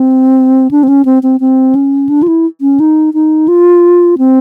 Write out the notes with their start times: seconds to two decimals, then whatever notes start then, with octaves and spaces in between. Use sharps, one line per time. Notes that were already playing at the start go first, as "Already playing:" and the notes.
Already playing: C4
0.71 D4
0.83 C4
0.88 C#4
1.05 C4
1.23 C4
1.40 C4
1.75 C#4
2.09 D4
2.23 F4
2.28 E4
2.61 C#4
2.80 D#4
3.14 D#4
3.48 F4
4.18 C4